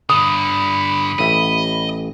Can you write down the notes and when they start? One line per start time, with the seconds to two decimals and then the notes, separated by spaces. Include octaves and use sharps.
0.10 G2 D3 B5 D#6
1.19 A1 D#5 E5